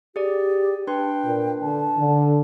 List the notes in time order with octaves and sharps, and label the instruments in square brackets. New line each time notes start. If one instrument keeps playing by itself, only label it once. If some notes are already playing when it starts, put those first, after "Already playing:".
[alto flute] G4 [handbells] G#4 D5
[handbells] D4 B4 C6 [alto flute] G5
[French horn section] A#2
[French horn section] D3 [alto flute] A5
[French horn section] D3